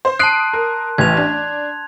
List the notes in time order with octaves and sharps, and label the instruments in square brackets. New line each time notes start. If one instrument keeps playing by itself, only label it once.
[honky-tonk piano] C5 C6
[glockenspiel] A5 C6 F#6 [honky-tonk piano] D#6 C7 D7
[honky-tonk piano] A#4
[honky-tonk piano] A1 E3 [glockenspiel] G#6 F7
[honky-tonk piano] D4